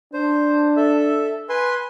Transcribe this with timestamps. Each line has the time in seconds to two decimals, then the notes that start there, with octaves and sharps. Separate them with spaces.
0.14 D4 C5
0.77 A4 E5
1.49 B4 G#5 C6